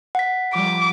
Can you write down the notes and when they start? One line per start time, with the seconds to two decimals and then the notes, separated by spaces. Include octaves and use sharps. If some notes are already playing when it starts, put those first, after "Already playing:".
0.15 F#5 B6
0.55 F3 G3 D6